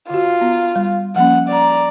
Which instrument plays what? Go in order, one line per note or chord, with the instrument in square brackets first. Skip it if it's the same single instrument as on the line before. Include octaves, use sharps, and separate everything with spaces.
[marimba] D3 F#4 [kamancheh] F4
[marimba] B3
G3
[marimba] F3 A#3 C#4 [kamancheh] F#5
[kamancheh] D5 A#5